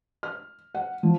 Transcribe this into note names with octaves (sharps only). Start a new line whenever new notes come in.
F6
F#5
F3